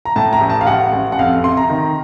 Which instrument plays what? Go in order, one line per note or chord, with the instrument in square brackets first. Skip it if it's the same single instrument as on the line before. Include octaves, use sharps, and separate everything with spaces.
[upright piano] A#5
A2 A5
A#5
A1
A5
F5
A1 F#5
A1
F#5
F2 F5
C3 C6
A#5
D#3